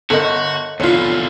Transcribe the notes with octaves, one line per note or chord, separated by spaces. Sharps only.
G1 F#4 A4 A#4 D#5 C#7
F1 E2 D3 F4 C#5